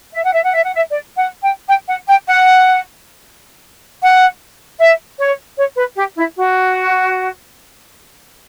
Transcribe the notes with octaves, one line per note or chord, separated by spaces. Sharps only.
E5
F#5
E5
F#5
E5
F#5
E5
D5
F#5
G5
G5
F#5
G5
F#5
F#5
E5
C#5
C#5
B4
G4
E4
F#4